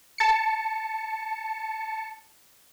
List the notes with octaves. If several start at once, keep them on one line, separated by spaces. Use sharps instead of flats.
A5 C#7